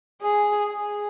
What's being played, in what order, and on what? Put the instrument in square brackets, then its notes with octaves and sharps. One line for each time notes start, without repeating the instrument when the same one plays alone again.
[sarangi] G#4
G#4